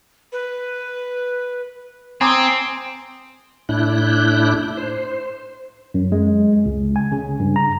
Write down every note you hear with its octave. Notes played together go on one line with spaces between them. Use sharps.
B4
C4 G#5 A#5 D6 D#6
A2 D4 E4 F#6 G6
C5
F#2
G#3
C#2
G#5
C#3
G2
A#5